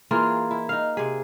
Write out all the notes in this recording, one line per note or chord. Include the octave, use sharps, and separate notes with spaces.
E3 A#3 F4 G#4
E4
D#4 F5
C3 G#4